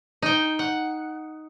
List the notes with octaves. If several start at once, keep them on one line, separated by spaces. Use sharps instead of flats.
D#4 G5
F#5